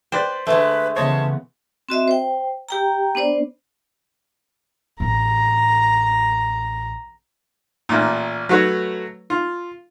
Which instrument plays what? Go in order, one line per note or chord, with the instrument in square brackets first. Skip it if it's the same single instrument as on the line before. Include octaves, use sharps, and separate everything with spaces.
[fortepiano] B4 D5 G5 [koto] C5
[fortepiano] D3 [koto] G#3 A3 [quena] B4
[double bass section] C#3 E3 B3 [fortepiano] C5 C#5 D#5 [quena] A5
[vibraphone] C4 F#4 D#5 E5
C5 G5
G4 G5 A#5
B3 D4 C5 D5
[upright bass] A1 [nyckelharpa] A#5
[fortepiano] A1 A#2
F#3 A3 F#4 B4 C#5
F4